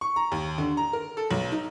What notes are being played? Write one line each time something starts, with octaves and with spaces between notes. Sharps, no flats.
C#6
A#5
D#2
D3
A#5
A#4
A4
B1
D#4